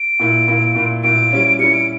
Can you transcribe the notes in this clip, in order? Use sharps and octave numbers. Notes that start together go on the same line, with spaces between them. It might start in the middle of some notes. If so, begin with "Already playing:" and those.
Already playing: D7
A#2 A#3 E4
A#2 A#3 E4
A#2 A#3 E4
A#2 A#3 E4 D7
G3 C#4 E4
G3 C#4 E4 C#7
D7